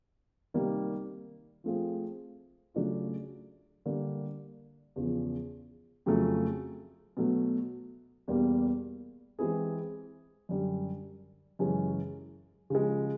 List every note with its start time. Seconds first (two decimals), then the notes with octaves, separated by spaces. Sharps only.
0.54 C3 D#3 G3 A#3
1.64 F3 A3 C4 F4 G#4
2.74 C#3 F#3 A3 D4 F4
3.86 D3 G3 A#3
4.96 E2 C#3 F3
6.06 F2 C#3 F#3 A3
7.17 B2 F#3 A3
8.28 E2 B2 G3 A#3
9.39 E3 G#3 C4 E4 G#4
10.49 F#2 D3 G3
11.59 F#2 C#3 E3 G#3 C#4
12.70 C#3 F3 G#3